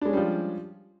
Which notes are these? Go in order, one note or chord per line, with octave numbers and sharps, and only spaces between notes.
F3 G3 G#3 C#4 D4